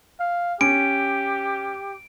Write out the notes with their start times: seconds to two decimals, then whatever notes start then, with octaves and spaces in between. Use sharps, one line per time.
0.20 F5
0.61 C#4 G4 D7